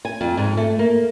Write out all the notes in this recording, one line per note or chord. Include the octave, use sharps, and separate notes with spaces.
G#5
F2
G#2
A3
A#3